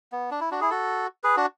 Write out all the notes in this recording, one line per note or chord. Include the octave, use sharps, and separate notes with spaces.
B3
D4
E4
D4 F#4
E4 G#4
F#4 A4
G#4 B4
D4 F#4